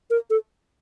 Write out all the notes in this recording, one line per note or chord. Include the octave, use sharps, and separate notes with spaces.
A#4
A4